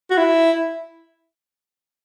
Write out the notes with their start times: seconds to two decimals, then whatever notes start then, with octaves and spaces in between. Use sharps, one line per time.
0.10 F#4
0.18 E4